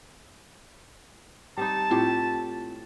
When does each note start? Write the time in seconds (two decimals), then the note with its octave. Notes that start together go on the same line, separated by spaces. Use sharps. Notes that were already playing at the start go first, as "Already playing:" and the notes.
1.57 G3 C4 D#4 A5
1.91 A2 C4 E4 F4 G4